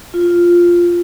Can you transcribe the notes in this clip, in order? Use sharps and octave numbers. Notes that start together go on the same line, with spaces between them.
F4